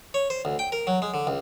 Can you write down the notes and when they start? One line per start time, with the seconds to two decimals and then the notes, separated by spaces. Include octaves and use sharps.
0.14 C#5
0.30 C5
0.45 D2
0.59 G5
0.72 A#4
0.87 F#3
1.02 G#3
1.14 D3
1.27 C#2